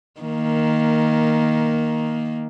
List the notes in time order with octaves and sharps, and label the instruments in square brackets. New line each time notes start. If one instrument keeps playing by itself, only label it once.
[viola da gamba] D#3 A#3